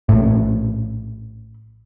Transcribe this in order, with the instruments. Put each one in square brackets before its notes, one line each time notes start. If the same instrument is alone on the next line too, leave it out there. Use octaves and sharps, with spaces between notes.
[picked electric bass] A#1 A2